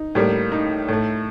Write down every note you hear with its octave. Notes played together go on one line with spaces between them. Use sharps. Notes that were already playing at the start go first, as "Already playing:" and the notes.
Already playing: D#4
A2 G3 A#3
D#4
A2 A3